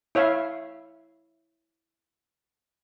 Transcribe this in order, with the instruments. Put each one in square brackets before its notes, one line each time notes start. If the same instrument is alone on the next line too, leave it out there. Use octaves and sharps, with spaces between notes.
[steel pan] E4 C#5 E5 F5